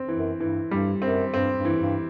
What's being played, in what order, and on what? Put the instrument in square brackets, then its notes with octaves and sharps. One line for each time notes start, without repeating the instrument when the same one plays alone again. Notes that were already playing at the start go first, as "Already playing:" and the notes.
Already playing: [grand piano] C4
E3
[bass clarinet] F#2
[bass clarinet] G2 [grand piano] E3
[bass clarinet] G2 [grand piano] G3
[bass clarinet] F#2 [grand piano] C4
[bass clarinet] G2 [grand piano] C4
[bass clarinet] G2
[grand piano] E3
[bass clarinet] G2